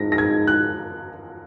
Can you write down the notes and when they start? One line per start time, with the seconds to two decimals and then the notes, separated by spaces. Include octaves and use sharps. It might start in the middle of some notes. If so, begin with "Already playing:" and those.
Already playing: G#2 A#6
0.12 A#6
0.18 G#6
0.47 F#6